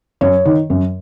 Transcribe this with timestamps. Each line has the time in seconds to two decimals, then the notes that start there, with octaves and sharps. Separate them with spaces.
0.21 F#2 C#5
0.45 D#3
0.70 F#2